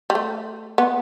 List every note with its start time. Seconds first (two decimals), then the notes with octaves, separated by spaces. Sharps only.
0.10 G3
0.15 A3
0.78 B3